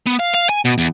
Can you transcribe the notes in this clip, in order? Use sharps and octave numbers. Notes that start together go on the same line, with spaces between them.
B3
F5
F5
G#5
B2
E2